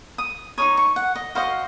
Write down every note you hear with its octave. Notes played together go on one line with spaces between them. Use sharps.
D#6
D#4 A#4 C#5 D#6
C#6
F#5
D#5
F#4 C5 D#5 F5